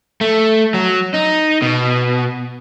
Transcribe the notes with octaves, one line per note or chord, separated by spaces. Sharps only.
A3
F#3
D#4
B2